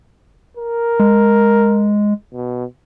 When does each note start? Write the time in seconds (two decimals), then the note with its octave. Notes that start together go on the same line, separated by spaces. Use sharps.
0.57 A#4
1.00 G#3
2.33 B2